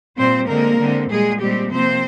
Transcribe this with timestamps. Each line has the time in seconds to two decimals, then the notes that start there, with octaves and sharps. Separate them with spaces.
0.18 A#2 G3 A#3 C4 C5
0.48 D3 G#3 A#3 C4 A#4
0.79 D3 G#3 C4
1.10 A#2 G3 G#3 A#3 G#4
1.40 A#2 G3 G#3 C4 G4
1.71 C3 F3 A#3 C4 C5